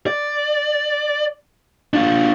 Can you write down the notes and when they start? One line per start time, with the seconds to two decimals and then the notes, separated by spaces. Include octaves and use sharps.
0.07 D5
1.94 D4 F4